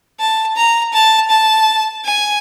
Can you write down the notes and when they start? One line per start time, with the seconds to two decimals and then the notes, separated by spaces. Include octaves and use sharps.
0.19 A5
0.56 A#5
0.93 A5
1.30 A5
2.04 G#5